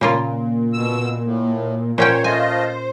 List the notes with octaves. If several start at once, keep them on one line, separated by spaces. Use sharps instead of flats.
A#2 C#3 A#3 F4
B2 E6
A2
A#2 C#4 C5 C#5 G5
A3 F4 D#5 G#5